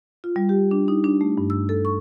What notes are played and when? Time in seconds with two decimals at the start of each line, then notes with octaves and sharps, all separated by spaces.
0.24 F4
0.36 G3
0.49 G4
0.71 D4
0.88 D#4
1.04 D4
1.21 A3
1.38 G2
1.50 E6
1.69 A4
1.85 C#6